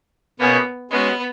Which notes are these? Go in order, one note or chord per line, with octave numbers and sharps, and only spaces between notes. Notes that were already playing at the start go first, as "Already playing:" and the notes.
B2 A#3 B3 C#4 G#4
G#3 B3 C#4 F#4